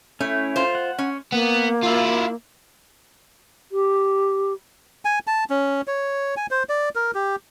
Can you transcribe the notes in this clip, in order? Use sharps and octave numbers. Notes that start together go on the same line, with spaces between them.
A3 C#4 E4
F4 C5
F#5
C#4
A#3 B3
E4 F4
G4
G#5
A5
C#4
C#5
G#5
C5
D5
A#4
G4